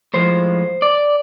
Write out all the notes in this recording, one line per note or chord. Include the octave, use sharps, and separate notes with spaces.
A2 F3 G#3 C5
D5